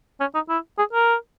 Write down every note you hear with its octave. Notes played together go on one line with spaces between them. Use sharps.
C#4
D#4
E4
G#4
A#4